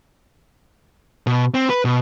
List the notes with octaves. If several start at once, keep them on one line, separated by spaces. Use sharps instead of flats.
B2
C4
B4
B2